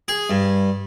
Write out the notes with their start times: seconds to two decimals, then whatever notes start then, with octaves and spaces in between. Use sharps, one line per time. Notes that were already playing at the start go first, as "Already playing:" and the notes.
0.08 G#4
0.30 G2